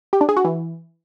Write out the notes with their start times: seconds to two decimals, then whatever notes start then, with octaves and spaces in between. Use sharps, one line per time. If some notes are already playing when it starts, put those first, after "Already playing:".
0.13 G4
0.21 D4
0.29 G#4
0.37 F#4
0.44 E3